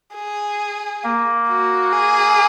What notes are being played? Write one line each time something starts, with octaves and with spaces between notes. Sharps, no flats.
G#4
A#3
F#4
G#4